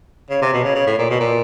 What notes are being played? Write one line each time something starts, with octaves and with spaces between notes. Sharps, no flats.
C#3
C3
B2
C#3
C#3
A2
A#2
B2
A#2